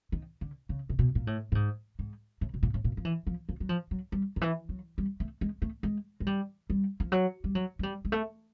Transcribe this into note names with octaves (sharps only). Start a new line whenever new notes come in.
D#3
D3
C#3
C3
B2
A#2
A2
A2
G#2
G#2
A2
B2
A#2
A2
A#2
F3
E3
F3
F3
F#3
F3
F#3
G3
D#3
E3
F#3
G3
A3
G#3
A3
G#3
G#3
G3
G3
F3
F#3
G3
F#3
G#3
G3
G#3
A3